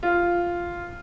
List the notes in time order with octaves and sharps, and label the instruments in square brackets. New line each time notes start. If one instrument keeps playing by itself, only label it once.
[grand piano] F4